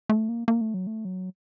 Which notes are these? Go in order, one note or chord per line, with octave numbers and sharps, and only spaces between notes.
A3
A#3
A#3
A3
F#3
A3
F#3